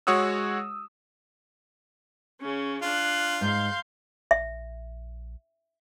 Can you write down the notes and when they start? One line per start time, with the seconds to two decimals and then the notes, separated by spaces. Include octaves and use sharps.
0.07 G#3 F#4 C#5 F#5 D#6 E6
2.40 C#3 C#4
2.82 D4 F4 F#6
3.41 G#2 F5 C6 G6
4.31 A#1 E5